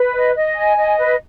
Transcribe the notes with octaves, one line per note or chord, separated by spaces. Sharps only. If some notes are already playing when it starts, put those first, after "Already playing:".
Already playing: B4
D#5
D#5
G#5
D#5
B4